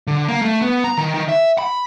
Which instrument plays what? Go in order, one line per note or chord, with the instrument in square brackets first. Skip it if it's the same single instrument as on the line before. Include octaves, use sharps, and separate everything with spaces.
[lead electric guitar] D3
A#3
A3
B3
A#5
D#3
D#3
E5
B5